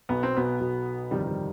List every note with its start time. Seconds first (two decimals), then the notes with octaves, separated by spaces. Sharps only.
0.09 B1 B2 B3
0.23 C4
0.37 B2 B3
0.60 B1 B2
1.11 G1 F2 C3 D#3 G3
1.27 G3